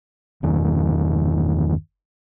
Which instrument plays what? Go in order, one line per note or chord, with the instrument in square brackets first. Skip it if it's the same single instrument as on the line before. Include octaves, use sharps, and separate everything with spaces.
[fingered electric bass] G1 E2 D#3